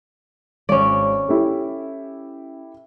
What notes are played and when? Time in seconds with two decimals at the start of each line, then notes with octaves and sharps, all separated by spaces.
0.69 G#1 C#4 D5
1.28 E4 G4 A4